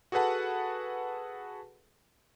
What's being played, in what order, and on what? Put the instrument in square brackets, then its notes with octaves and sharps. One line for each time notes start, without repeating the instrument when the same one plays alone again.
[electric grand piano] F#4 G#4 A4 B4 F#5 A5